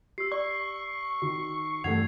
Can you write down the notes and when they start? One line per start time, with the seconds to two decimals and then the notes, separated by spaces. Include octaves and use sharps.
0.18 G4 E6 C7
0.32 D5 C#6
1.22 D#3 F#4
1.84 G2 E3 A3 F#5 G#6 C7 F7